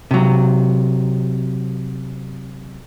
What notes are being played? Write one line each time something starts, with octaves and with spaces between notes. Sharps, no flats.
C3 F#3